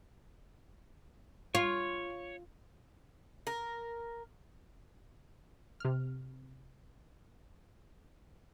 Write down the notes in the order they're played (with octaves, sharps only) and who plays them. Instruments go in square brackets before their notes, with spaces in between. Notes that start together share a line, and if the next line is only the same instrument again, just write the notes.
[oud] F4 [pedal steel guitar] C#5
[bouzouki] A#4
[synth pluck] C3 F6